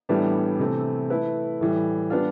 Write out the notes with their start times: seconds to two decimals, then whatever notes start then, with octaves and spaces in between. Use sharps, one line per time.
0.09 A2 E3 G3 B3 D4
0.59 C3 E3 A3 C4
1.10 A3 E4 B4
1.61 A2 E3 G3
2.10 G3 B3 D4 F4